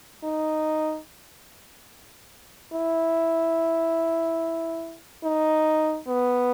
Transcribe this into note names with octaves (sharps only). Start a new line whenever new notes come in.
D#4
E4
D#4
B3